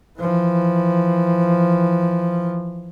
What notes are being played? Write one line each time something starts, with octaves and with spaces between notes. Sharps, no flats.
E3 F3